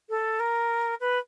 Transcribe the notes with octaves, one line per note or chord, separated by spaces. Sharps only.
A4
A#4
B4